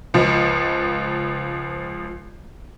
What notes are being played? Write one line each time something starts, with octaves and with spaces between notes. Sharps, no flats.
C#2 F3